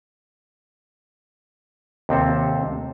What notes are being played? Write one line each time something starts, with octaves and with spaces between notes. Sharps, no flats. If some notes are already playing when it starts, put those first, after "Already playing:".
D#2 C3 C4 A4